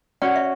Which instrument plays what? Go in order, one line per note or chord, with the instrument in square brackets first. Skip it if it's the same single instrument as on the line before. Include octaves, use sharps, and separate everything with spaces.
[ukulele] C#4 F#4 C#5 [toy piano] D5 F#5
[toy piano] E5